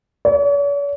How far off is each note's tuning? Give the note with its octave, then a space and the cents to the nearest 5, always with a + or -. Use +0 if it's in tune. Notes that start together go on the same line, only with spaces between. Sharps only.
C#5 +45